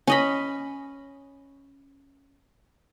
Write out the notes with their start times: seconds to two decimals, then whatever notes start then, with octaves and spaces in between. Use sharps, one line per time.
0.07 C#4 D#5 B5